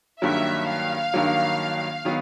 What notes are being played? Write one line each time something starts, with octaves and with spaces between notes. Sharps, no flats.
G2 D#3 F#3 A#3 E5
F5
G2 D#3 F#3 A#3
D#3 F#3 B3